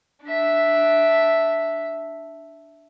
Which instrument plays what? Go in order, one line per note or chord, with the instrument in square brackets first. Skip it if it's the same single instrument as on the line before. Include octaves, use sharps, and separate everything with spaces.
[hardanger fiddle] D4 E5